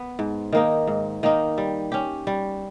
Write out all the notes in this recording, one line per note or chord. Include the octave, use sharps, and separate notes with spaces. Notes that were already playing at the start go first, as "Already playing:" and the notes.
Already playing: B3
G#2
D#3 A#3 D#4
G#2
D#3 A#3 D#4
G3
C#4 G4
G3